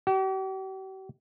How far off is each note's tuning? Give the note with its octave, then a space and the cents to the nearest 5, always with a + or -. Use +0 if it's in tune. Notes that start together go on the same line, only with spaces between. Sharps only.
G4 -45